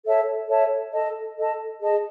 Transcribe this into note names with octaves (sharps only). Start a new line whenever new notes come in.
A4 C#5 E5 A5
A4 C#5 E5 A5
A4 D#5 A5
A4 D#5 A5
G#4 D#5 A5